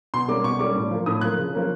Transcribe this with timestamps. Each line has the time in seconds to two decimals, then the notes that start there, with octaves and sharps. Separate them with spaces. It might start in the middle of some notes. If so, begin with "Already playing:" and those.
0.14 B2 C6
0.28 G3 A#3 C#4 D6
0.44 B2 C#6
0.59 G3 A#3 C#4 D6
0.75 A2
0.91 F3 A#3
1.06 A2 D#6
1.21 F3 A#3 F#6
1.38 C#3
1.53 F3 A#3 C#4